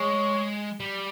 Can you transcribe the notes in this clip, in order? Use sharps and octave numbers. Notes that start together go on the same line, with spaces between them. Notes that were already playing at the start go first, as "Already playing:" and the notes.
Already playing: G#3 C#5
G3